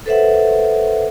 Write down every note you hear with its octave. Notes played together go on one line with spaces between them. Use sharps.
A4 B4 C5 E5 F#5